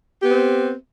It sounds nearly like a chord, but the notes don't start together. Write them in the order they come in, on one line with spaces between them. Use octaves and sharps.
G4 B3 C4